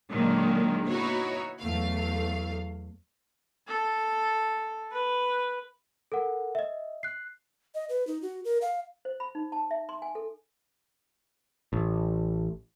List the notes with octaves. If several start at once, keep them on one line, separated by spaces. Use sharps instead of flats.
A#2 D3 D#3 F#3 G#3 A#3
B3 D#4 E4 F#4 C#5
E2 F#3 A3 F5
A4
B4
A4 A#4 F#5
D#5 E5
F#6 C7
D#5
B4
D#4
F#4
A#4
F5
C5
B5
D#4
A5
E5
C6
G#5
A4
A1